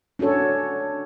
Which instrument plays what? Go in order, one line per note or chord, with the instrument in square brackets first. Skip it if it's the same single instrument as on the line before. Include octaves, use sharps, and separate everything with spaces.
[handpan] C#4 D4 F#4 A4 C#5